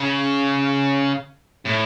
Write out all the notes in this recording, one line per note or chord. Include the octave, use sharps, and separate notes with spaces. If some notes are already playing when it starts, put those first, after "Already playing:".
Already playing: C#3
A2